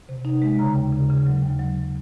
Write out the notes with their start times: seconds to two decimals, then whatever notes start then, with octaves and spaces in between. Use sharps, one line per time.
0.09 C3
0.25 D#4
0.42 G#3
0.59 C#3 A#5
0.75 D#2
0.92 C#3
1.10 C#3
1.27 F#3
1.43 D#2
1.59 F#3